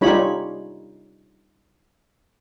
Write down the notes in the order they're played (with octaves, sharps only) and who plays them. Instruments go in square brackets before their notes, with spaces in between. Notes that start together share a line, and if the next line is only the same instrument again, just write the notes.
[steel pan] G3 C#4 D#4 F4 C#5 B5